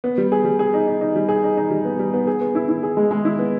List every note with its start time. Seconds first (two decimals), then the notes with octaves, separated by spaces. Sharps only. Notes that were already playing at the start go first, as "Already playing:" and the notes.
0.04 B3
0.18 G3
0.32 G#4
0.45 G3
0.59 G#4
0.74 D#4
0.87 D#4
1.01 D#4
1.16 G3
1.29 G#4
1.44 D#4
1.57 D#4
1.71 G3
1.85 B3
1.99 G3
2.14 B3
2.27 G#4
2.41 B3
2.55 E4
2.69 E4
2.83 G#4
2.97 G#3
3.11 G#3
3.25 E4
3.39 B3